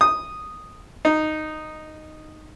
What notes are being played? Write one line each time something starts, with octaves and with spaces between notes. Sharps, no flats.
D#6
D#4